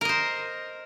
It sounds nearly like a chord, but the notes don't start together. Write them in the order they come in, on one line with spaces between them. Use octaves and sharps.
A#4 D#5 C5